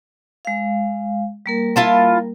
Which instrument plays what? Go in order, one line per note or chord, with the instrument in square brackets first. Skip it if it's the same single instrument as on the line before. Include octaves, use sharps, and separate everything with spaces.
[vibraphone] G#3 F5
G3 A#3 A#4
[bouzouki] E4 F4 A5